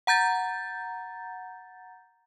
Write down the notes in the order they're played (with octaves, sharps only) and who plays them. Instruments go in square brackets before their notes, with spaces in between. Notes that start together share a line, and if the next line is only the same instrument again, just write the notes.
[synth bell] F#5 A#5 G6 A6